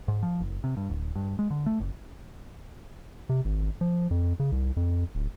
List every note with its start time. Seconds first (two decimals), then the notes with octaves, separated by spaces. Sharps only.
0.08 G#2
0.23 F3
0.40 F#1
0.64 C3
0.77 G2
0.90 D1
1.15 G2
1.39 G#3
1.51 D3
1.66 A3
1.80 F#1
3.29 C3
3.45 G#1
3.81 F3
4.11 F2
4.40 C#3
4.52 C2
4.77 F2
5.15 D1